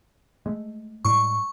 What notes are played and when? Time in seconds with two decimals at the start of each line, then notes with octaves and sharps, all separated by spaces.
0.46 G#3 A3
1.05 A2 G3 G#3 C#6